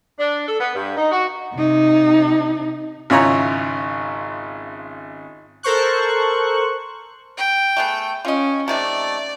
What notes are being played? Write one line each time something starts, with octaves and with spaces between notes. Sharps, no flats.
D4
A4
B3
G2
D#4
F#4
C3 D#4
G#1 C#3 E4 F4 C#5 A#5
A4 A#4 C5 C#6 F#6
G5
A3 B3 G#4
C#4 F4 D#5
C3 D#3 A3 D5